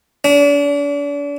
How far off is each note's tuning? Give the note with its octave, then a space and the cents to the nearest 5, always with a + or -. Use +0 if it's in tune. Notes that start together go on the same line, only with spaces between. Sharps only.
D4 -40